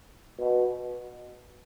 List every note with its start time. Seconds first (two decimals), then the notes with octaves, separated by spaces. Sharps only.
0.38 B2